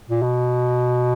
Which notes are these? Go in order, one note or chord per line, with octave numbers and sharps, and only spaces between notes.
A#2
B2